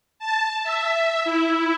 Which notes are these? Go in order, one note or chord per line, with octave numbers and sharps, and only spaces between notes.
A5
E5
E4